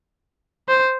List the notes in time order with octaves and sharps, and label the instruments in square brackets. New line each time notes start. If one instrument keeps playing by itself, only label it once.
[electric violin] C5